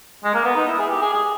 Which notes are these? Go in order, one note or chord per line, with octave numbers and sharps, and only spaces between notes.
G#3
A#3
B3
D#4
E4
G#4
G4
G#4
G#4